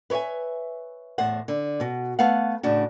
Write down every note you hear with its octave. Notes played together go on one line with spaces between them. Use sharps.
B4 C#5 D5 E5 G#5
E2 A2 C5 F#5
D3
B2 F#4
A3 B3 F5 F#5
A2 C#3 D4 F#4